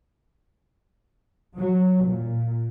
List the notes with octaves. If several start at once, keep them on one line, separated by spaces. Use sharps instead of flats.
F#3
A#2